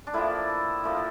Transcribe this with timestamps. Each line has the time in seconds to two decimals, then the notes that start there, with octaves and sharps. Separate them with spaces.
0.07 D4
0.14 A2 F3 A#3 E4
0.84 A2 F3 A#3